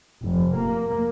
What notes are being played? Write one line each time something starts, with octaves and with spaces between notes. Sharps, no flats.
F1
A#3